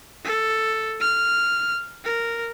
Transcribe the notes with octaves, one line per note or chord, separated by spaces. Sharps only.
A4
F6
A#4